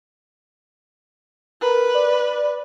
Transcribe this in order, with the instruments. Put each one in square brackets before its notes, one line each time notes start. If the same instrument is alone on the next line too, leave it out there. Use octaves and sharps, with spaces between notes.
[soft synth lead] A#4 [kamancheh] B4
[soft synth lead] D5